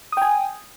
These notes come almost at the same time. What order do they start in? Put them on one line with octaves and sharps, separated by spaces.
D#6 G5 G#5